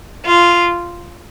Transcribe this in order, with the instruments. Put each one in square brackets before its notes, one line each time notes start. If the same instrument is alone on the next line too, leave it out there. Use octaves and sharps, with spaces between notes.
[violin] F4